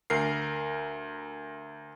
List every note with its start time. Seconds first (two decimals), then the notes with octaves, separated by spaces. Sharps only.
0.10 D2 A#4 C7